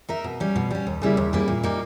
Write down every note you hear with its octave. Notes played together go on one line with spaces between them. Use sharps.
D#4 A#4 E5
B2
G3 C#4
B2
G3 C#4
D#2
C#3 G3 A#3 E4
D#2
C#3 G3 A#3 E4
A#2
G3 A#3 D#4